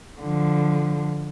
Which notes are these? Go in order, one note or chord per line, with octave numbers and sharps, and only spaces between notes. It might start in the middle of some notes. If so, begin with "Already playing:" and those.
D3 F3